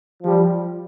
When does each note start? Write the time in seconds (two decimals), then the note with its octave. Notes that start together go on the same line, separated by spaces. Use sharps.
0.23 F3 G3